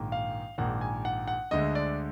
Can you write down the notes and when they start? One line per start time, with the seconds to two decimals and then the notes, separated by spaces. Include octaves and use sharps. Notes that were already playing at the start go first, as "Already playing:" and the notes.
Already playing: A#1 G#2 D#3 A#3
0.12 F5
0.58 A#1 G#2 D#3 A#3 F#5
0.81 G#5
1.05 F#5
1.28 F#5
1.51 D2 D3 G#3 D#5
1.75 D5